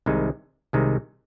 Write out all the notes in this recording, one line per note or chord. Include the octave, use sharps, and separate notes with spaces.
C2 C3 D#3 G#3 D#4
C2 C3 D#3 G#3 D#4